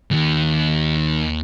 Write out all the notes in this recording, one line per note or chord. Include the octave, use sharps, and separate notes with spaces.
D#2 D#3